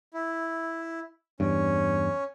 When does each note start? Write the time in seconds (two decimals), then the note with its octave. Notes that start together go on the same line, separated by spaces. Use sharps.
0.14 E4
1.40 E2 G2 C#4